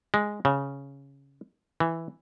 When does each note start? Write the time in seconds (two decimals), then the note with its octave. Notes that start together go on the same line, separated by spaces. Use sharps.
0.14 G#3
0.45 C#3
1.80 E3